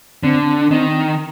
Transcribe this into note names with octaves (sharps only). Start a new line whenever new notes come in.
D3 C4
D4
D#3 C4